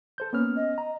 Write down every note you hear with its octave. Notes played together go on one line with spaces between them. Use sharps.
A4 C5 G6
A#3 B3 C#4 F6
D#5
A#5